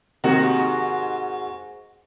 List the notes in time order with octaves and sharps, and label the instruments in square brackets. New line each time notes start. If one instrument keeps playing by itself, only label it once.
[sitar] G#2 F#4 [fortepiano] C3 D#3 A#3